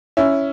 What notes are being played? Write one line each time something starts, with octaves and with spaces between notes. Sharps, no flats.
C#4 E4